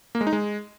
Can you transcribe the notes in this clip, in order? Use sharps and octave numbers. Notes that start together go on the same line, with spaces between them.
A#3
G#3
D#4
G#3